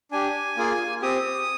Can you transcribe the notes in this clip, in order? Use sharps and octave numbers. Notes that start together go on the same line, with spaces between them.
D4 G4 G#5
A#3 F4 G#4
C4 G4 D#6